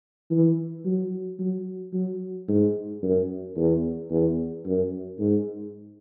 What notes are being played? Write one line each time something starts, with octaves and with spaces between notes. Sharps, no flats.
E3
F#3
F#3
F#3
G#2
F#2
E2
E2
F#2
G#2